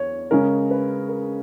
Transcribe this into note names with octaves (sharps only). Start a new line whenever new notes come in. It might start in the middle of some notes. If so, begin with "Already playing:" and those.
Already playing: E2 C#5
C#3 G#3 C#4 A#4
B4
A#4